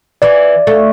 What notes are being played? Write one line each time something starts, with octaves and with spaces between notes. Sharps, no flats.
E3 D5
A3